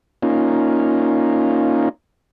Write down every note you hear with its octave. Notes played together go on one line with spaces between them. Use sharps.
A#3 C#4 D#4 F4